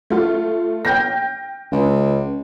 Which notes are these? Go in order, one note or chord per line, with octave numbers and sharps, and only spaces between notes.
A3 F4
G5 G6 A#6
C#2